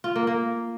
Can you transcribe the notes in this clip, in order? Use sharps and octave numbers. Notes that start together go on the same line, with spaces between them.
F4
A#3
A#3